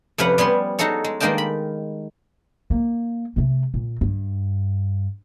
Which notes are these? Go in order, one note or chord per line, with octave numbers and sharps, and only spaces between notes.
F2 C3 C#4 B4 F5 F#5
G3 B3 G#5 C6
D#4 F#4 G#4 A4 C#5
G#3
D#3 G#3 A#3 D#4 G5 A5
B5
A#3
C3 A3
A#2
G2